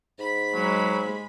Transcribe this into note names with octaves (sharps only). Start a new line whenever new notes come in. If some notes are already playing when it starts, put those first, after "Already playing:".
G#2 B5 B6
F#3 G#3